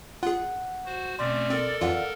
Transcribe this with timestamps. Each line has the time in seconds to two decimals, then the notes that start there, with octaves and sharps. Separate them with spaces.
0.23 F4 G#4 F#5
0.86 F#4 C5
1.19 B2 A3 C4 C#4 D5 C6
1.50 C4 A4 A#4
1.81 F2 E3 F4 D5 F5 F#5